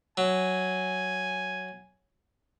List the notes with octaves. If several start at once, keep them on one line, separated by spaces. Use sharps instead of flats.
F#3 G#5